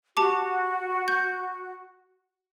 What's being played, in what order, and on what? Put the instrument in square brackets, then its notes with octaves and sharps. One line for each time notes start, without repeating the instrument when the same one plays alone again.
[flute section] F#4 [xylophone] G4 A5 D6
[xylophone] G6